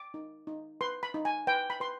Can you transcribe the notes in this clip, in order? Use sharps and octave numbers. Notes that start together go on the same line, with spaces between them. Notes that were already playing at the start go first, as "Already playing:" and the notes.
Already playing: D6
D#4
D#4
B4 C6
B5
D#4
G#5
B4 G5
B5
B4 C6